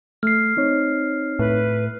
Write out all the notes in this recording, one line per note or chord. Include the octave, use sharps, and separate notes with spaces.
A3 F6 C7
C4 D#4 C#5
A2 B4